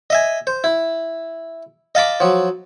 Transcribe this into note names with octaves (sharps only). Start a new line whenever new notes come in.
D#5 E5 G#5
C5
E4
D#5 F5 A5 B5 D6
F3 F#3